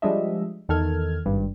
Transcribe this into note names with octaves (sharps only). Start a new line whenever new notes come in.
F3 G3 G#3 D4 D#5 E5
E2 D#3 A4 F6 G#6
G#1 G2